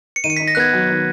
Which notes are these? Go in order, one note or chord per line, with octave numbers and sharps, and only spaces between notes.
C#7
D#3 D#7
C#7
B6
D#4
A#6
B3 F#6 G#6
F#3
D#3